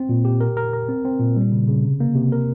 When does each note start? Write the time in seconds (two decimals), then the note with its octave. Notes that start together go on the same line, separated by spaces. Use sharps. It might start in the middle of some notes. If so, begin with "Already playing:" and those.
Already playing: C4
0.09 A#2
0.25 G4
0.41 A#4
0.57 A#4
0.73 A#4
0.89 C4
1.05 C4
1.20 A#2
1.36 G3
1.52 C#3
1.68 C#3
1.84 C3
2.00 A#3
2.15 C3
2.32 A#4